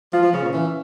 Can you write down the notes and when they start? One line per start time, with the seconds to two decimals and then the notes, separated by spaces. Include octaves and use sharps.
0.13 F3 F4
0.23 F3
0.33 C#3 C#4
0.43 A#2
0.54 E3